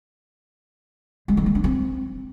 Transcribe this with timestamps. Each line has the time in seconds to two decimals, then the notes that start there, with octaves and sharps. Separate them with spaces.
1.28 G#3
1.37 D#3
1.46 A#3
1.55 D4
1.64 C4